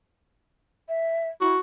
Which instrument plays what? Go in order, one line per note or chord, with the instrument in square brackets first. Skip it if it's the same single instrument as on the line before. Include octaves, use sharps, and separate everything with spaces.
[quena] E5
[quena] E4 [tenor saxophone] F#4